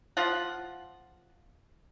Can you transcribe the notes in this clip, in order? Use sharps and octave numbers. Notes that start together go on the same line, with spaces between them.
F3 F4 F#5